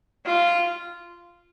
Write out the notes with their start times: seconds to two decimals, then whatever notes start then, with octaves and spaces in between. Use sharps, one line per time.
0.26 F4